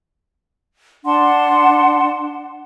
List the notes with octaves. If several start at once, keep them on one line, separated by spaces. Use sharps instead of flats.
D4 F#5 A5 C6